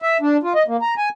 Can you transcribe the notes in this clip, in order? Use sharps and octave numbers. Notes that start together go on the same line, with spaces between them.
E5
D4
F4
D#5
A#3
A#5
G#5